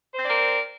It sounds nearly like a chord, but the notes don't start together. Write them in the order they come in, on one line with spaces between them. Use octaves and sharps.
C5 C4 D5 A#4